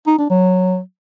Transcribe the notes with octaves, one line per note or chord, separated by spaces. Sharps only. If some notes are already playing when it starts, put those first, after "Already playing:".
D#4
D4
F#3